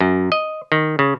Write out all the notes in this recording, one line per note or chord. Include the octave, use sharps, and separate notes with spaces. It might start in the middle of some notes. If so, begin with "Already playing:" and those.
F#2
D#5
D#3
C#3